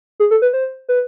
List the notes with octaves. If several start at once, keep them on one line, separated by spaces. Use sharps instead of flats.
G#4
A4
B4
C5
B4